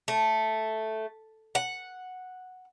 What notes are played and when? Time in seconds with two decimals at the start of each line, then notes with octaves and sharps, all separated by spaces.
0.08 A3
1.55 F#5